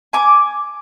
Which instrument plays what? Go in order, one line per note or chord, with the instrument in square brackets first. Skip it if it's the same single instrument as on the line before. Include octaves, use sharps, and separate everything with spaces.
[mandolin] G#5 D6